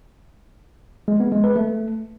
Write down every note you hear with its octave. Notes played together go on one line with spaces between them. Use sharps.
G#3
B3
G#3
B4
A3